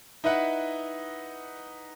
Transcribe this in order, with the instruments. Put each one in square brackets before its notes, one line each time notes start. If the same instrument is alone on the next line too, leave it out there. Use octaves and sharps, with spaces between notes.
[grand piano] D#4 E4 B4 E5 F#5